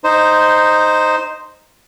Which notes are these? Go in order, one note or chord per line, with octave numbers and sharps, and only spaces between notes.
D#4 C5